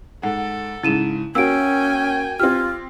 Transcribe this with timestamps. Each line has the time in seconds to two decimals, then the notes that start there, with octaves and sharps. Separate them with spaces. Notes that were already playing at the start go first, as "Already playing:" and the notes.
0.23 G#2 A4 F#5
0.83 G#2 C#3 E4 D#7 E7
1.35 A#3 C#4 F#4 G5 G#5 E6 D7
2.40 C4 F4 G4 F6